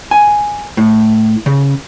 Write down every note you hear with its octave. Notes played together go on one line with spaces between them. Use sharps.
G#5
A2
C#3